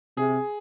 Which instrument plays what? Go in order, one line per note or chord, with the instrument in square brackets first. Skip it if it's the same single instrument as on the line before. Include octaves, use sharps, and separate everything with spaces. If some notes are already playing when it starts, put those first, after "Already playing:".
[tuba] C3 [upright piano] G#4